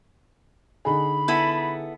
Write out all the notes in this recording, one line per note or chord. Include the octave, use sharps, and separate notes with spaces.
D3 D#4 G#4 B5
B3 E4 A4